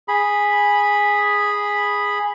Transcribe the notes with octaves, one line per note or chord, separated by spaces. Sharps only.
G#4 B5